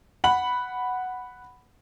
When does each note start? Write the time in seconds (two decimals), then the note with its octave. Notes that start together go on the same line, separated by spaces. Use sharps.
0.24 F#5 B5 F#7